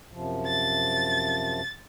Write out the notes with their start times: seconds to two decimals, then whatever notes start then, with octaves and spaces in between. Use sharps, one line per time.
0.11 F#2 C3 F3
0.46 A6